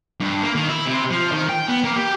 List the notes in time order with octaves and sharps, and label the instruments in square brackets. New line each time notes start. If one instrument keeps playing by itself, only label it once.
[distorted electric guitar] G2
A#3
D#3
E4
C3
F3
D#3
G5
B3
A#3
G4